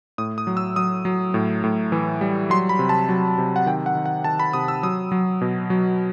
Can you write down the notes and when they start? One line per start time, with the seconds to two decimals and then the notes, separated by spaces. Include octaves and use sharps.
0.18 A2 D#6
0.38 D#6
0.47 F#3
0.57 E6
0.76 F#3 D#6
1.05 F#3
1.34 A2
1.64 A2
1.92 E3
2.21 G3
2.50 F#3 C6
2.69 B5
2.79 C3
2.89 A5
3.09 F#3
3.38 C3
3.56 F#5
3.66 D#3 G5
3.86 F#5
3.95 D#3
4.06 F#5
4.24 D#3 A5
4.40 B5
4.53 C3 D#6
4.68 E6
4.83 F#3 D#6
5.12 F#3
5.41 B2
5.70 F#3